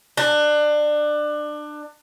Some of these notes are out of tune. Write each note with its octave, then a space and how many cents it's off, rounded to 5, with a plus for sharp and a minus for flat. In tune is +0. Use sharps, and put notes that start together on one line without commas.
D4 +25